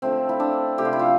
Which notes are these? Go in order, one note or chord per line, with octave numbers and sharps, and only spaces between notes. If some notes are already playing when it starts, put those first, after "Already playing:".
D3 F3 A3 C4
E4
D4
C3 F3 A3 G4
F4
E4
F4